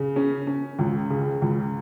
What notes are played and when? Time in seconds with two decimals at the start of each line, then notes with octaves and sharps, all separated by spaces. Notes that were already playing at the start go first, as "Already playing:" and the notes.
Already playing: C#3
0.16 C#4
0.47 C#4
0.79 C#2
1.10 C#3
1.42 C#2